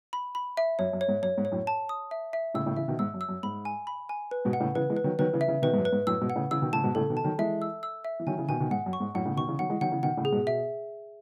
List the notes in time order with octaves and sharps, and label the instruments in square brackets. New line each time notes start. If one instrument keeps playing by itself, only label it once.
[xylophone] B5
B5
E5
[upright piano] F#2 [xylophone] C#5
[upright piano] F#2
[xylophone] C#5
[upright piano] G#2
[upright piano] F#2 [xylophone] C#5
[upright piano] G#2
[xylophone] C#5
[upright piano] F#2 A2
[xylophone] A5
D#6
E5
E5
[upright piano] A2 C#3 [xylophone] E6
[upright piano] A2 C#3
[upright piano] C#3 E3 [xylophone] E5
[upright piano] B2 D#3
[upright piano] G#2 [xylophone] E6
[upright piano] F#2
[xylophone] E6
[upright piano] F#2
[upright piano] G#2 [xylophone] B5
[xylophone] G#5
B5
G#5
B4
[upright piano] G#2 B2
[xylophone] F#5
[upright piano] A2 C#3
[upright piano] C#3 E3 [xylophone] B4
[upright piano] E3 G#3
[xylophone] B4
[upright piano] D#3 F#3
[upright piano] D#3 F#3 [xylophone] B4
[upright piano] C#3 E3
[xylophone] E5
[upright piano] C#3 E3
[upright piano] B2 D#3 [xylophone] B4
[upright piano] G#2
F#2
[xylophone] B4
[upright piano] G#2
[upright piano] F#2 A2 [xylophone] E6
[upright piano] G#2 B2
[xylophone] F#5
[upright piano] A2 C#3
[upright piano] C#3 E3 [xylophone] E6
[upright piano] B2 D#3
[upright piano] A2 C#3 [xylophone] A5
[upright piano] G#2 B2
[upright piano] A2 C#3 [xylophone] A4
[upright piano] B2 D#3
[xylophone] A5
[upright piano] D#3 F#3
[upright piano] E3 G#3 [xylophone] E5
[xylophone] E6
E6
E5
[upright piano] E3
[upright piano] D#3 F#3 [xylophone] G#5
[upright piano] C#3 E3
[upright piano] B2 D#3 [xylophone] G#5
[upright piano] B2 D#3
[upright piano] G#2 [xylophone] F#5
[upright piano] F#2
[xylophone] C#6
[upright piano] G#2
[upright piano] F#2 A2 [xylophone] F#5
[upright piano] A2 C#3
[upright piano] B2 D#3 [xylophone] C#6
[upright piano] C#3 E3
[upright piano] D#3 F#3 [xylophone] F#5
[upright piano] E3 G#3
[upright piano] D#3 F#3 [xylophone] F#5
[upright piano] C#3 E3
[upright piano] B2 D#3 [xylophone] F#5
[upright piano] A2 C#3
[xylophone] G#4
[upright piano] G#2 B2
[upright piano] B2 [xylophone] E5